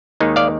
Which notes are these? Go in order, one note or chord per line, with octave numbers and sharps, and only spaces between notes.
D#2 D#3 G#3 D#4
D5 F5